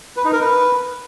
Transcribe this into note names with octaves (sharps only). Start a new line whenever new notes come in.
B4
D#4
A#4
B4